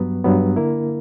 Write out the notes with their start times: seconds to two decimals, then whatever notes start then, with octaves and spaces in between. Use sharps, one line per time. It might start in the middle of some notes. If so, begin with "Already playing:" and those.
Already playing: G2 F#3 B3
0.24 G2 F#3 B3
0.56 D3 A#3 E4 A#4